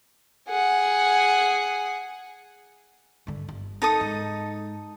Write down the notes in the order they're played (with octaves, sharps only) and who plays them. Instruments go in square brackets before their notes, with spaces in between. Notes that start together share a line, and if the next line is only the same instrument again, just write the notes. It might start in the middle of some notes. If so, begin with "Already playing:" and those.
[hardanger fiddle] G#4 F#5
[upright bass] G2 D3
G1
[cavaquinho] D#4 A4 D#6
[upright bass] G#2